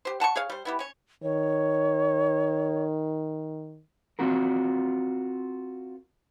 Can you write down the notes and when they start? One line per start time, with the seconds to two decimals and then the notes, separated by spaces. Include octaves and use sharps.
0.05 G4 C5
0.20 F#5 A5 A#5 C#6
0.36 G#4 C#5 F5
0.50 G3 C5
0.65 B3 E4 G4
0.79 C#4 C#5
1.23 D#3 C#5
4.19 C4 F4 F#4 A#4